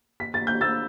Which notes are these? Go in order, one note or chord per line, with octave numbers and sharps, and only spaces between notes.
B6
A6
G6
E6 A6